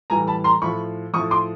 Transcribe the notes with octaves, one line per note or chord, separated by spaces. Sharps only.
A2 E3 G3 G#5 A#5
A5 B5
A#5 C6
A2 F3 B5 C#6
F3 C#6 D#6
A2
C6 D6